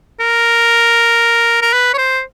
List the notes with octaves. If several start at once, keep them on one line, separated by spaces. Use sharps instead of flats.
A#4
A#4
B4
C#5
C5